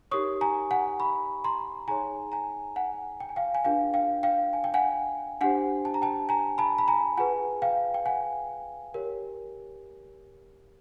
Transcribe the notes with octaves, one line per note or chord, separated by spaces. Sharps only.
D#4 G4 A#4 C#5 C#6 D#6
G#5 A#5
F#5 G#5
B5 C#6
A#5 C6
D#4 G#4 C#5 G#5 A#5
G#5 A#5
F#5 G#5
G5
G#5
F5 G5
G#5
D4 F4 G#4 B4 F5 G5
F5 G5
F5 G5
G#5
G5
F#5 G#5
D4 G4 C5 F#5 G#5
A5
A#5
G5 A5
G#5 A#5
A5 B5
B5
G#5 A#5
F4 G#4 B4 F#5 G#5
F5 G5
G5
F#5 G#5
G4 A#4 C#5